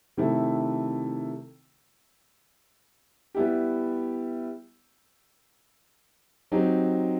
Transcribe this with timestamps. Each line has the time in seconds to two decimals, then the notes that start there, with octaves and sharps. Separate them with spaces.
0.17 C3 D#3 A3 E4
3.34 G3 B3 E4 G4
6.52 F#3 C4 D#4 G4